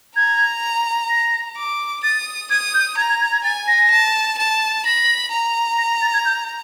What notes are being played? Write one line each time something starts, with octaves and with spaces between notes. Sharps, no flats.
A#5 G#6
A#6
D6
D#6 A6
D#6 G#6
G6
A#5 G#6
G#6
G#6
G#6
G#5 A6
A#6
A5
A5
B5 A#6
A#5
A#6
A#6
A6
G#6
G6